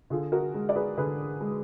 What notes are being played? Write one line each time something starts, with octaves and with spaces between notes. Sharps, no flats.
D3 F4 G#4
F#4 A#4
G#3
D5
G#4 B4
D3 G#4 B4
G#3